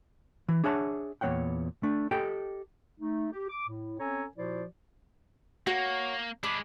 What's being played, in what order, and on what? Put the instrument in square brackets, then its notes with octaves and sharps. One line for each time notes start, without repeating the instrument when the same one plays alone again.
[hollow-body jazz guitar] E3
D4 G#4 C#5 E5 F#5 A5
E2 A#2 A3 C#5 F#5 G5
A3 D4
G4 A4 D#5 G5
[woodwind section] A3 D#4
G4
D6
A2
C4 C#4 A4 C#5 G#5 A#5
A#2 F3 E4 F#4 C5 D5
[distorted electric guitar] A#3 [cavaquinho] F#4 C#5
[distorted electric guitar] G#3 D4 [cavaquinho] B5 D6